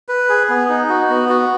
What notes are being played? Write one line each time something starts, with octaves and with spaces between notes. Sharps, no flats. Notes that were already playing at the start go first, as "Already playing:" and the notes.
B4
G#4
B3
D#4
F#4
B3
F#4